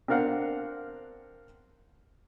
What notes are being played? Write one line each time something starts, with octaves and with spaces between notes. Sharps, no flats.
C4 D4 A#4 F5 F#5